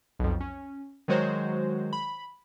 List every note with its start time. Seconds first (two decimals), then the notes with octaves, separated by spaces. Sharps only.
0.19 B1 F2
0.41 C#4
1.08 D#3 F#3 G#3 F#4 C5 C#5
1.93 B5